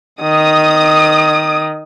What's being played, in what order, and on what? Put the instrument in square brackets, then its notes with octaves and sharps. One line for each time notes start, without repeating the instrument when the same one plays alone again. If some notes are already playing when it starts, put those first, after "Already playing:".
[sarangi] D#3 [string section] D#6